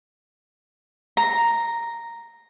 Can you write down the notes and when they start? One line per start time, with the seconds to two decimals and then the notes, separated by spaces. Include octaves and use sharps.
1.17 A#5